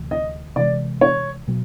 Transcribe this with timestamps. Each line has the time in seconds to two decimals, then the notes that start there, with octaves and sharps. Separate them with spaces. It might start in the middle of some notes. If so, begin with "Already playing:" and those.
Already playing: D2 C3 E3
0.11 D#5
0.56 C3 E3 G#3 D5
1.01 C#5
1.48 B2 F#3 B3